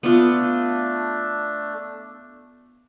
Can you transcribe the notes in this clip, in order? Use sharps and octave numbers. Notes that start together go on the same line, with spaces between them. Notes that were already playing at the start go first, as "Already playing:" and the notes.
A3 B3 D4 F4